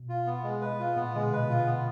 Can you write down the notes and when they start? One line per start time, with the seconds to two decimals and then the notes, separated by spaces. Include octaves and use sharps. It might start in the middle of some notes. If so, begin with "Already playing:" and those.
Already playing: B2
0.09 F4
0.26 B3
0.44 G#3
0.61 B4
0.79 F4
0.96 A#2 B3
1.15 D3 G#3
1.21 B2
1.32 B4
1.44 B2
1.49 F4
1.66 B3